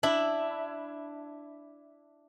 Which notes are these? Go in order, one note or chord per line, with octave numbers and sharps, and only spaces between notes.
D4 E4